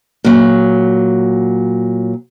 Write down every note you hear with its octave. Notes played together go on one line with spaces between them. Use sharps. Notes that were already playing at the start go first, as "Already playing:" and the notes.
A#2 F#3